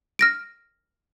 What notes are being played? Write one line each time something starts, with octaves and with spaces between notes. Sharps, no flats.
F6 A#6 D7